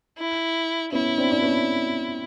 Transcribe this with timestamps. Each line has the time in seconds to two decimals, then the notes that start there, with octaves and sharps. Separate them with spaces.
0.18 E4
0.92 B3 C#4 E4
1.18 C4 D4
1.31 D4
1.42 B3 C#4